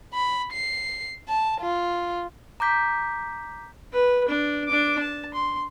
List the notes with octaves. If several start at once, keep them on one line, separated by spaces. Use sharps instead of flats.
B5
C7
A5
F4
A#5 D6 G6 B6
B4
D4
D4 D6
A5
C6